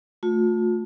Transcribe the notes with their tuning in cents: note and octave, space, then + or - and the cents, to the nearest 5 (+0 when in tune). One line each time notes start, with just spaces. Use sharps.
A3 +5 F4 +40